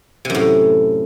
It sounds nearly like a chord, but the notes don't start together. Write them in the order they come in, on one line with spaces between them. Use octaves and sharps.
C3 F#2 A2